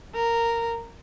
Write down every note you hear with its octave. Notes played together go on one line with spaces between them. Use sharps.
A#4